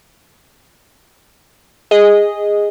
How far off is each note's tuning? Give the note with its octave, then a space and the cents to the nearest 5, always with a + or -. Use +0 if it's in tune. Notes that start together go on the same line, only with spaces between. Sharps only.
G#4 -15 D#5 +0